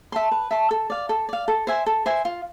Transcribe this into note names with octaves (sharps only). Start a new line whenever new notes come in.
E5 A5 C6
B4
E5 A5 C6
A4
D5 F5
A4
D5 F5
A4
C5 E5 G#5
A4
C5 E5 G#5
F4